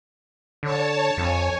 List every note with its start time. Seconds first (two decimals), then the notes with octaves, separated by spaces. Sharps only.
0.63 D3 C#5 A5
1.17 F2 C#5 G#5